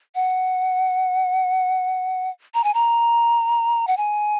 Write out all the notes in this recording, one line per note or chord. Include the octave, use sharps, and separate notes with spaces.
F#5
A#5
G#5
A#5
F#5
G#5